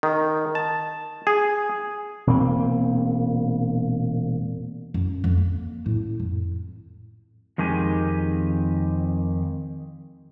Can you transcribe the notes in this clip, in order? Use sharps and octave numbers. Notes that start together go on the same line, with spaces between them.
D#3
A5
G#4
E1 A#2 A#3 C4
F#2
F2
A#3
A2
F2
F2 D#3 G#3 G4 G#5